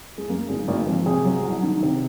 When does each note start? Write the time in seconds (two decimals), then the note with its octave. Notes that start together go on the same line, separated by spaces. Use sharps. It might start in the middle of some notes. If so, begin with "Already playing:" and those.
0.18 G#3
0.29 F#2 A#3
0.49 G#1 G#3
0.68 G#1 A#3
0.87 F3 C4
1.06 C3 G#4
1.24 F#3
1.44 C2
1.63 D#3
1.83 C3